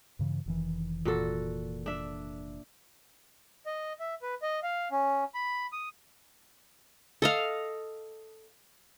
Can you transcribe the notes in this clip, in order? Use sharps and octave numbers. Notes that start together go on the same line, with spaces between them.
G2 C#3 E3
F1 D#3 E3
A#2 F#4 A4
D4 E5
D#5
E5
B4
D#5
F5
C#4
B5
D#6
A4 D#5 F5